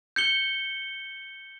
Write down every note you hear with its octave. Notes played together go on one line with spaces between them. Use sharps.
G6 C#7 G7